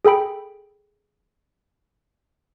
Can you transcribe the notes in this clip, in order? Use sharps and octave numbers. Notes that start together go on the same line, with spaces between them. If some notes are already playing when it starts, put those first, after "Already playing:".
G#4 A4 G5 B5 D7